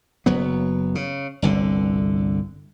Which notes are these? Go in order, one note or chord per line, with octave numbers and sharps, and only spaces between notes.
F#1 F#3 B3
C#3
G1 C2 D3